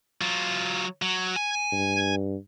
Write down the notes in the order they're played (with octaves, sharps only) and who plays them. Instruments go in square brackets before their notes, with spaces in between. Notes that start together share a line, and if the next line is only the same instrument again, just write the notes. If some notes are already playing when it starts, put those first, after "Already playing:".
[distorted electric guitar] F#3 F4
F#3
G#5
[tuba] G2